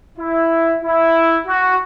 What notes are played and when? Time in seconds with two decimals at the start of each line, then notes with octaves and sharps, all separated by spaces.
0.17 E4
0.82 E4
1.47 F#4